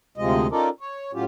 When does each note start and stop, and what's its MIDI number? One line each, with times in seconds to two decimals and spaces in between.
0.17 0.47 38
0.17 0.47 48
0.17 0.47 53
0.17 0.47 56
0.17 0.47 75
0.51 0.69 61
0.51 0.69 63
0.51 0.69 65
0.51 0.69 69
0.51 0.69 70
0.51 0.69 74
0.80 1.11 73
1.13 1.25 45
1.13 1.25 54
1.13 1.25 61
1.13 1.25 65
1.13 1.25 67